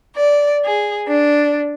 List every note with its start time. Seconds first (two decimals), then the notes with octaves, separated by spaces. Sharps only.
0.16 D5
0.63 G#4
1.07 D4